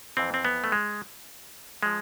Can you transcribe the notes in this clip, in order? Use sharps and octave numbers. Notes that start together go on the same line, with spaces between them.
F2 E3 C4
C4
B3
A3
G#3
F3 G#3